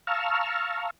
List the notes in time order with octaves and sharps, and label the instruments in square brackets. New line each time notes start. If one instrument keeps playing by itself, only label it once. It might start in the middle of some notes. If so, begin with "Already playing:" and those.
[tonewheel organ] F5 A5 A#5 C#6 E6 F6